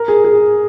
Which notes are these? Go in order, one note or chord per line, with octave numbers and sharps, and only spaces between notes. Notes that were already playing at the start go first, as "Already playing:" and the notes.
Already playing: A#4
G#4
G#4